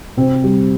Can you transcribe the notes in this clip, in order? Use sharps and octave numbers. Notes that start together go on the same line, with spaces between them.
C3 C4 C5
G3